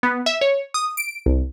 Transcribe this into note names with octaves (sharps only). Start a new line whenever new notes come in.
B3
E5
C#5
D#6
D7
C2